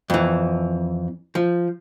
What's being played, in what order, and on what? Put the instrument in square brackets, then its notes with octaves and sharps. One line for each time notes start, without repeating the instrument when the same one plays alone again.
[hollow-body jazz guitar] F2 E3
F3